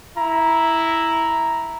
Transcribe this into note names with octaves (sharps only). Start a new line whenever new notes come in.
E4 A#5